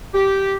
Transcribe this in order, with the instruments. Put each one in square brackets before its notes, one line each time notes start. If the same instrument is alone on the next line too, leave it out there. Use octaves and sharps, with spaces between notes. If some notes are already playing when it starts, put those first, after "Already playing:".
[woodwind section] G4